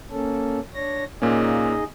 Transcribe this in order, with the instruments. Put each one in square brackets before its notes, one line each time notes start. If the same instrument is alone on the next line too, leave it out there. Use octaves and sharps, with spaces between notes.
[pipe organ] A#3 C#4 A4
D4 C#5 A#6
[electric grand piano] A#2 A#3 C#4 [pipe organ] D#4 G#4 D#5